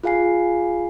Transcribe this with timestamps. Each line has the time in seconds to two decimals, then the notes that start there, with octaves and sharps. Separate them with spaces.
0.03 F4 G#4 F5 G#5 C7